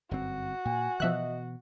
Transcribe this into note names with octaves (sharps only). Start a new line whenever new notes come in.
G1 F#2 C4 F#4
A#2 G#5
B2 E3 F3 D#5 E5 F#6